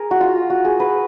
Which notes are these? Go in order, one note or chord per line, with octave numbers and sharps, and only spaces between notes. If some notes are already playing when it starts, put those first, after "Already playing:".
Already playing: G#4 A#4
F#4
F4
F#4
G#4
B4